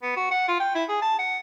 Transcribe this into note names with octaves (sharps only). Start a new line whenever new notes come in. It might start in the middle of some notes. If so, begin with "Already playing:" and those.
B3
F#4
F#5
F4
G5
E4
G#4
A5
F#5